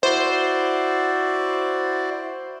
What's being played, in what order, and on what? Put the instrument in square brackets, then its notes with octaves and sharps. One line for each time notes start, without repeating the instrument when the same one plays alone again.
[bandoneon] E4 F#4 D5 [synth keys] C5